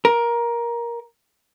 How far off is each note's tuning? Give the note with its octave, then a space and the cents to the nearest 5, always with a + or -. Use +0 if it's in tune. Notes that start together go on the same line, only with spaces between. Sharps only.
A#4 +15